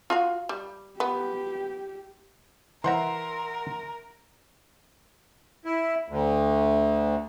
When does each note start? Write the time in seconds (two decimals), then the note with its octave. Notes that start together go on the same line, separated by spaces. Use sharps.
0.10 F4 F#4 F5
0.49 G3
1.00 B3 G4
2.84 E3 A#4 C5 E5 F#5 A#5 C6
5.65 E4
6.09 D2